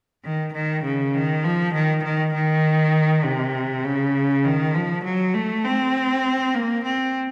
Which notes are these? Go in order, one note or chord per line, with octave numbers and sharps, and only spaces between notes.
D#3
D#3
C#3
D#3
F3
D#3
D#3
D#3
C3
C#3
D#3
F3
F#3
A3
C4
A#3
C4